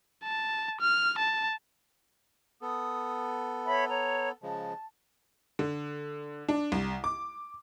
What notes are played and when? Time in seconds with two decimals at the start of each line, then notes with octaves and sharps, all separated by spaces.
0.24 A5
0.81 F6
1.19 A5
2.62 B3 A4 D#6
3.66 C#5 E5 B5
3.89 C#5 A#5
4.43 C#3 F3 G#3 A5
5.59 D3
6.49 D4
6.72 C2
7.04 D6